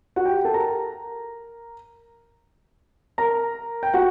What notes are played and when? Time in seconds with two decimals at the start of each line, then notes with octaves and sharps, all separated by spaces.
0.16 F#4 F#5
0.26 G4 G5
0.45 A4 A5
0.54 A#4 A#5
3.18 A#4 A#5
3.83 G5
3.94 F#4 F#5